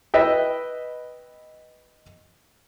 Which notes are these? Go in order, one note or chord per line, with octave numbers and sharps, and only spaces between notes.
B4 D#5 E5 G5